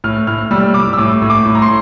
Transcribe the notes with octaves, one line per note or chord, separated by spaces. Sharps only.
A2 F6
A2 F6
G3 E6
G3 D6
E6
A2 D6
A2
D6
A2
A#5
C6